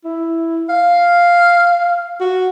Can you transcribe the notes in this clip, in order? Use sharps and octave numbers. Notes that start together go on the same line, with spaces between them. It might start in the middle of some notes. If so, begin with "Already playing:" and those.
E4
F5
F#4